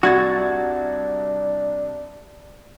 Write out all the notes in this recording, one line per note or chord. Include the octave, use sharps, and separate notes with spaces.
C2 D4 F#4 G#6 A6